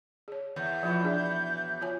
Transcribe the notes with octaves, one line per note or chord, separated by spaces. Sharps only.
G#4 C#5
E2 G6
B2 E3 F3 F4 C#5
D4 G#4 D5
F4 C#5 G#5